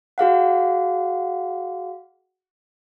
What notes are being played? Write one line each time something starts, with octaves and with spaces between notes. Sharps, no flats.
F#4 G#4 F5 F#5